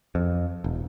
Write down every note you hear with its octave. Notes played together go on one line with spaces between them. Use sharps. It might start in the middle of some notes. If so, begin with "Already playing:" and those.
F2
E1